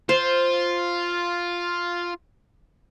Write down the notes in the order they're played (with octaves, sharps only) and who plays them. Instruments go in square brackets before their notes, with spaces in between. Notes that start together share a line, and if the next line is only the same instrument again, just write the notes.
[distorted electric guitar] F4 [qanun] C5